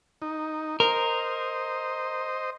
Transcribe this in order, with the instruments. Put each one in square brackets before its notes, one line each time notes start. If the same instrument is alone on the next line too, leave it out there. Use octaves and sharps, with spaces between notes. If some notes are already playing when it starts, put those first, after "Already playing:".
[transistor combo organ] D#4
[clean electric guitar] A#4 [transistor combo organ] C5 D#5